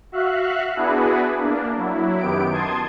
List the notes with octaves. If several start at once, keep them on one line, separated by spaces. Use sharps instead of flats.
F#4 E5 F5 F#6
B3 D4 E4 F#4 G#4 B4
A#3 D4
F#3 E4
F#2 D#3 B3 G4 D7
A5 C6 D#6 G#6